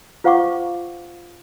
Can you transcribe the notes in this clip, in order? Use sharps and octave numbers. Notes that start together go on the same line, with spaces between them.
F4 C5 F5 F#5 C#6 D6